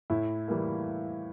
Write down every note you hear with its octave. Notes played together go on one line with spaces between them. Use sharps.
A2 E4
E3 G3 A#3